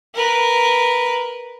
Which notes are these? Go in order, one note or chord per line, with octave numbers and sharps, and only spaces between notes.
A#4 B4